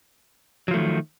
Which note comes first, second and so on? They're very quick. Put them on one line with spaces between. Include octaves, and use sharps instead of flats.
F#3 F3 A3 D#3